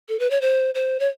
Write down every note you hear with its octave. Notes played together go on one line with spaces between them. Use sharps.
A4
B4
C#5
C5
C5
C#5